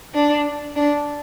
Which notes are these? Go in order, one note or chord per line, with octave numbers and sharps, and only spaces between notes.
D4
D4